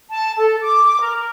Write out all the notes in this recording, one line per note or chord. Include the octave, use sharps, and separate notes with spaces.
A5
A4
D6
A#4